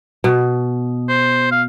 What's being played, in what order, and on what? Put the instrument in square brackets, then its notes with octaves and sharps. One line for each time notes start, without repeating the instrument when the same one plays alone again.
[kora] B2
[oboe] C5
F5